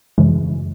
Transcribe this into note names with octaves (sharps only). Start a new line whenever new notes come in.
F#2 C#3 E3 G#3